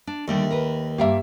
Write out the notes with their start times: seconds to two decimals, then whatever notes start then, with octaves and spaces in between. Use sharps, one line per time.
0.07 D4
0.28 D#2 D3 G3 A3
0.51 A#4 B4
0.98 G2 A#3 G4 E5 F5